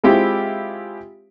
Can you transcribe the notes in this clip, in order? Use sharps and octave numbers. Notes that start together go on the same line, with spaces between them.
G#3 C4 E4 F4 G4